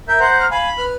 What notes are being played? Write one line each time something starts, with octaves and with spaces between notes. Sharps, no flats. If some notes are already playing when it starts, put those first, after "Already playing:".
A#4 E5 G6
C5 F#5 A#5
F6
F5 G#5 B5
B4 F6